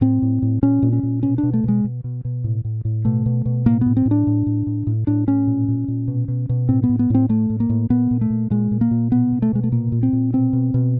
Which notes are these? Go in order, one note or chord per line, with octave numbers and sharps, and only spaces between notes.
A2 C4
A2
A2
A#2 C#4
A#2
C#4
A#2
B2 C#4
D4
B2
A3
B2 G#3
B2
B2
B2
A2
A2
A2
B2 A3
B2
B2
A2 A#3
A2 B3
C4
A2
D4
A2
A2
A2
A2
A2 D4
A2 C#4
A#2
A#2
A#2
B2
B2
B2
A2 C4
B3
A2
B3
A2 C4
A2 A3
A2
A#3
A2
A#2 B3
A#2
A3
A#2
A#2 G#3
A#2
A#3
A#2
B2 B3
B2
A3
B2 G#3
A3
A#2 A#3
A#2
C4
A#2
B2 C4
B2
B2